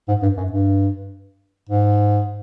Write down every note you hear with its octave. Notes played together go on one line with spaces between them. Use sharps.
G#2
G2
F#2
G2
G#2